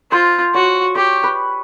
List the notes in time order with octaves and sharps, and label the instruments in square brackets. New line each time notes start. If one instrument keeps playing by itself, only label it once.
[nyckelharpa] F4 [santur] C5
[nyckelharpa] F#4 [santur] C#5
[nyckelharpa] G4 [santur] C#5
[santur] B4